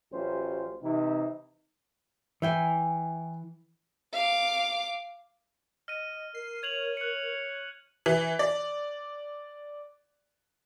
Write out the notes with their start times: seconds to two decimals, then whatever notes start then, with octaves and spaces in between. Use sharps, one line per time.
0.13 A1 F#3 C#4 F4 G4 C5
0.82 C3 E3 D#4
2.42 E3 E5 G5 G#5
4.13 F5 D6
5.88 D#5 F6 D#7
6.35 A#4 C7
6.63 C#5 G#6 F7 F#7
6.97 F#6 C#7
8.06 E3
8.39 D5